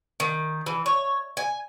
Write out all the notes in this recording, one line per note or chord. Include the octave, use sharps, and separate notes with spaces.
D#3
E3
C#5
G#5